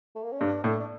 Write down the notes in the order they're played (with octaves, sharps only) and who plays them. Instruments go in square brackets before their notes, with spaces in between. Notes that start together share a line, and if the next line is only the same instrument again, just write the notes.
[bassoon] A3
A#3
C#4
[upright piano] G2 [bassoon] D4
[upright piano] A2 [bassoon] D4
[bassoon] D4